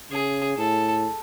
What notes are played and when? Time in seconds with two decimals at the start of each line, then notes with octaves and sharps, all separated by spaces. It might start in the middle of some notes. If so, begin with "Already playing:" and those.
0.11 C#3 G#4
0.58 A2 A4